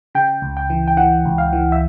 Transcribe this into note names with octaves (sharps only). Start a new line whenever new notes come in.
C#3 G5
C#2
G5
E3
G5
E3 F#5
C#2
F5
E3
E5